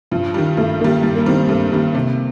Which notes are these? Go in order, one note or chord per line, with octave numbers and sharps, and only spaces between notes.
G2 F3
D#3 G3
G2 A3
D#3 G3 A#3
G2 G3
A#3
D#3 G3 C4
A#3
G2 A3
D#3 G3 A#3
C3